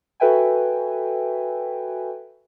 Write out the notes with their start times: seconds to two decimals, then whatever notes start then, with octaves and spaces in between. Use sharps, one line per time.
0.20 F#4 A4 B4 E5 G5 G#5